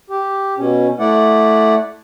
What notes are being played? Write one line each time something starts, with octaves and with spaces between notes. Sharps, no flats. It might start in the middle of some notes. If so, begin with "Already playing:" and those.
G4
B2 C#4
A3 E4 D5 F#5